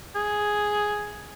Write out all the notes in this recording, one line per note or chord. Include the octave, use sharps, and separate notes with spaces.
G#4